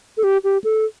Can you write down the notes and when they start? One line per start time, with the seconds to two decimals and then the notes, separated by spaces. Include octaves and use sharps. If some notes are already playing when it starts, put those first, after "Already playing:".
0.17 A4
0.24 G4
0.44 G4
0.64 A4